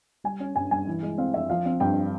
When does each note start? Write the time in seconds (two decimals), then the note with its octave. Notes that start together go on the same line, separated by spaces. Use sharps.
0.24 G3 G#5
0.40 C#4
0.56 G2 G#5
0.71 G2 G#5
0.87 E3
1.02 G#3
1.18 C4 F5
1.34 F2 E5
1.50 F3 F5
1.65 C4
1.80 G2 G5